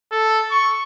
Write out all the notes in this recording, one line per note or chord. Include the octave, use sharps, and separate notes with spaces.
A4
C#6